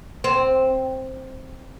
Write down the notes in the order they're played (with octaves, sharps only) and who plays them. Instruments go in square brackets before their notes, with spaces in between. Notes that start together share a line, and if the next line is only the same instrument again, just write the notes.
[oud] C4